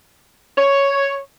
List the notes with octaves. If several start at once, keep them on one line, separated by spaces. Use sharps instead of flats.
C#5